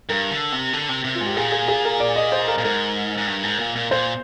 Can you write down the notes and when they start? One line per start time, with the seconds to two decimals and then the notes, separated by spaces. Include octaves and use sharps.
0.09 G2 A#4
0.31 D3
0.52 C3
0.73 D3
0.89 C3
1.04 C3
1.15 F4
1.21 G#2
1.26 G4
1.36 A#2 G#4
1.52 G#4
1.68 G#4
1.85 A#4
2.00 D5
2.16 D#5
2.32 C5
2.48 A#4
2.58 A#2
2.64 G#2 A#4
3.18 G#2
3.27 G2
3.43 G#2
3.59 A#2
3.76 A#2
3.91 A#2 C5